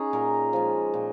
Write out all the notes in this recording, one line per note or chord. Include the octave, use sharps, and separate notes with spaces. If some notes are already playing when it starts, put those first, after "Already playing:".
Already playing: C#4 D#4 G#4
A#2 A#4
F3 G#3
A#2